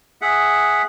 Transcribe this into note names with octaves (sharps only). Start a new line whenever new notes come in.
G#4 E5 F#5